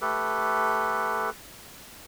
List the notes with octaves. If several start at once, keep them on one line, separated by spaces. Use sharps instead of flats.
A3 G4 A4 B4